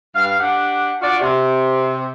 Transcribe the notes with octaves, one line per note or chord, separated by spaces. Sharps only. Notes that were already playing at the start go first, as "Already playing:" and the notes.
G2 F5
D4 G4 F#5
D4 F4 F#4 D5
C3